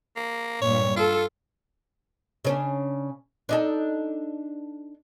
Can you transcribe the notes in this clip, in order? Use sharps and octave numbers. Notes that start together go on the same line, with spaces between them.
A#3
G2 A#2 C#5
F4 A4
C#3 C#4 D4
D4 D#4 A4